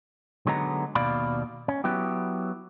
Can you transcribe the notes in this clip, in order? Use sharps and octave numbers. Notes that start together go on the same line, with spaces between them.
D3 F#3 G#3 B3 D#4 A#5
D#2 B2 D5 F5 B5
C#4
F#3 B3 E4 G4